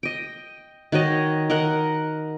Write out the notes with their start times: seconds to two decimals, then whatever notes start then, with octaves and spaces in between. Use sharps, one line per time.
0.03 D#5 G5
0.92 D#3 F#4 C#5 D#5
1.50 A#4 D#5 F#5